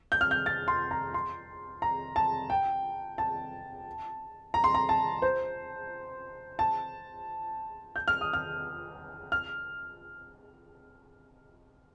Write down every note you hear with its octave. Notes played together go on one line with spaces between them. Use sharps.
G6
F6
G6
A6
C6
A#5
C6
A#5
A5
G5
A5
A#5
C6
A#5
A5
C5
A5
G6
F6
D#6
F6
F6